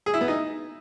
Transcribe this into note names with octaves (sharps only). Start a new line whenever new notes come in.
G#4
E4
B3
D#4